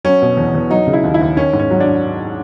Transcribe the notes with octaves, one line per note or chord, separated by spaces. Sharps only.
F#3 C#4
B2
E2
E2
F#3 D#4
C#3
E4
D#2
E4
D#2
D#3 C#4
G#2
C#4
F#3
D4